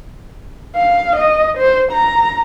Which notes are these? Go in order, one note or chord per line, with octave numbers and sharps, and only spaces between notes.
F5
D#5
C5
A#5